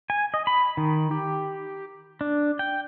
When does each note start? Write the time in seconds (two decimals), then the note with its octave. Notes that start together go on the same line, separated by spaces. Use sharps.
0.10 G#5
0.34 D#5
0.47 B5
0.77 D#3
1.11 G4
2.21 D4
2.59 G5